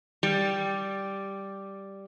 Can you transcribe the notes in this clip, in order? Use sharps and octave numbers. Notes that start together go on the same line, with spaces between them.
G3